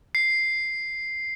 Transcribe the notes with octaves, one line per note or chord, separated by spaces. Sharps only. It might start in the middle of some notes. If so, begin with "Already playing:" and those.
C7